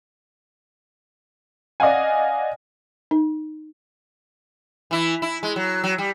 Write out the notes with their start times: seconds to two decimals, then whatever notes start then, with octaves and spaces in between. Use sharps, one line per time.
1.80 D5 D#5 F5 F#5 G#5
3.11 D#4
4.91 E3 E4
5.22 E4
5.43 G#3
5.56 F#3
5.83 F#3
5.98 G3